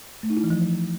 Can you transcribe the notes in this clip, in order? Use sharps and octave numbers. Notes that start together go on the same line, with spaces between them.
A3
D#4
E4
E3
F3